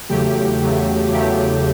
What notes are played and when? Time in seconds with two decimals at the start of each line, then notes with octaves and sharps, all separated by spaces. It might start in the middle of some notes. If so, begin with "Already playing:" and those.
0.09 E2 C#3 F#3 A3 G4
0.60 E2 C#3 F#3 A3
1.12 E2 C#3 F#3 A3 G4